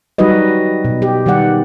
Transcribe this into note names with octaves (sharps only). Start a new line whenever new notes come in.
F#3 G3 D#4 F#4 B4 D#5
B2
G4
D#3 G3 B3 D5 F#5